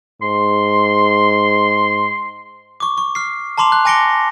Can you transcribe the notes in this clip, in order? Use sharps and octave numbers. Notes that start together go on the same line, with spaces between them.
G#2 C6
C#6 D6
C#6
F6 C7
A5 A#5 C6 D6 F7
F#6
G#5 D6 A#6 C#7 D7 G7